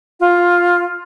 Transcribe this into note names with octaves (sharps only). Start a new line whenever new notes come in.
F4